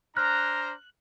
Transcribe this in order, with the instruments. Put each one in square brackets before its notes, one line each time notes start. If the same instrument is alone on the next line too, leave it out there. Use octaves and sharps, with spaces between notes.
[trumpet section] D4 C5 A#5 [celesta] F6 [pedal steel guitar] F#6